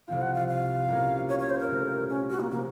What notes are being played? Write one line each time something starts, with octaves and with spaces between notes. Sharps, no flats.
C2 C3 F3 C4 F4 F5
F#5
F5
F5
C2 A#2 F#3 A#3 C#4
C#5
C#5
C5
A#4
C2 A#2 F#3 A3 C4
C#4
F#4
A#3
C3 F3 A#3